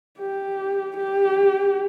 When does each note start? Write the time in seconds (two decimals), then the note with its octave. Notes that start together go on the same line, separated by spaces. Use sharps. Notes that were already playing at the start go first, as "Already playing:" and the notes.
0.19 G4
0.97 G4